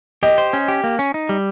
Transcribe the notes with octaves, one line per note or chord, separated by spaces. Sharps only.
G4 D#5
C5
C#4
G4
A#3
C#4
D#4
G3